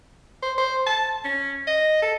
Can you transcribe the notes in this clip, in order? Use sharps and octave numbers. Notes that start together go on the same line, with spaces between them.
C5
C5
A5
C#4
D#5
A4